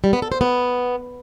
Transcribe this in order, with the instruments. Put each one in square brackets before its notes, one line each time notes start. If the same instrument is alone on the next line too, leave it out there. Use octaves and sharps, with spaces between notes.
[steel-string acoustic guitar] G3
B3
A4
C5
B3